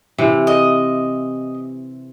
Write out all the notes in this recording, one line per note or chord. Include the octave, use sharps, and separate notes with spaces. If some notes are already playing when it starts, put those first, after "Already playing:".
C3 E3
D#5